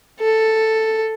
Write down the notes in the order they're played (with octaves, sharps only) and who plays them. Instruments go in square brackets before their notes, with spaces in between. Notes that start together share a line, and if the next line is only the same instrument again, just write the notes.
[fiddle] A4